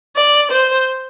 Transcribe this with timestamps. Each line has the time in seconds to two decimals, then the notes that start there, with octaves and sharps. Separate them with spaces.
0.16 D5
0.51 C5